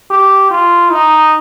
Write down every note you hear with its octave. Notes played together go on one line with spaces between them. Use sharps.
G4
F4
D#4